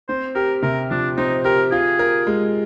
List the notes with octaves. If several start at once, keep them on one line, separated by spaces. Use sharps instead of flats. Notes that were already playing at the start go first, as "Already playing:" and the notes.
C4 C5
G4 A#4
C3 A#4
F3 D4
C4 D#4
G4 A#4
F4 G#4
A#4
G#3